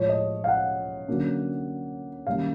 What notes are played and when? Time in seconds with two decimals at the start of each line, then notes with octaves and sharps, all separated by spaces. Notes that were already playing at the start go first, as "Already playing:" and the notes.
Already playing: A2 F3 G#3 C#5
0.09 D#5
0.44 F5
0.48 F#5
1.07 D3 F#3 A#3 C#4
2.27 F#2 D#3 G3 A#3 F5